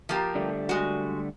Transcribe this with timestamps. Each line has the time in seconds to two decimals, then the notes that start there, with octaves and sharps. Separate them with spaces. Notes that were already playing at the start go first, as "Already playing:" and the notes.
0.09 F3 A#3 G4
0.35 D3 G3 A3
0.69 G#3 F#4